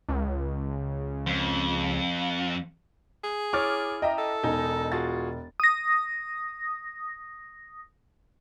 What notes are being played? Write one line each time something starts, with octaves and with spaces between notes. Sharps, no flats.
C#2
F2
G#4
E4 C#5 D6 F6 A6
D#5 E5 G5 A#5
A4
E1 D#4 G#5
F4 F#4 G#4 A6
D#6 A#6